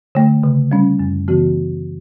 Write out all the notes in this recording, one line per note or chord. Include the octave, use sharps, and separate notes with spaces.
D3 A3
C#3
G3 C#4
F#2
C#3 E3 B3 F#4